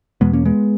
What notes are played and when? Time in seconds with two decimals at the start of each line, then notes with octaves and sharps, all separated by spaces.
0.21 E2 B2 G#3 B3
0.33 A#3 C#4
0.45 G#3 B3